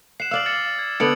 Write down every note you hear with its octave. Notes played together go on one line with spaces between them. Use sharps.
F#5 C7 E7
D5 F5 E6 F6 F#7
D6 A6 C#7
G#6
D3 B3 C#7 D7 F#7